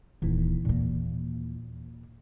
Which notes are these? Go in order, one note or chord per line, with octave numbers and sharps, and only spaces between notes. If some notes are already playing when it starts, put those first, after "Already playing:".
D#1 D#2 E3
A#2 A#3